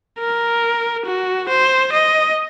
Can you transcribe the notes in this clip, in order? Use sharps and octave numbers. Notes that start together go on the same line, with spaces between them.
A#4
F#4
C5
D#5